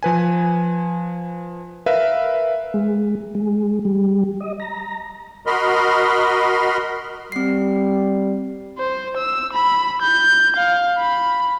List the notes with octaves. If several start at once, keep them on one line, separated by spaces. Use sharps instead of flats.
F3 B4 G#5
A#4 B4 E5 F5
G#3
G#3
G3
D#5
A#5
F#4 A#4 D#5 B5 C6 F6
G3 C4 C7
C5
E6
B5
G6
F5
B5